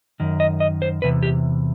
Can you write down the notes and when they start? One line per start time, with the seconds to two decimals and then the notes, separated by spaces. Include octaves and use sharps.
0.20 F#2 D#3
0.40 D#5
0.60 D#5
0.82 C5
1.02 E2 C3 B4
1.23 G4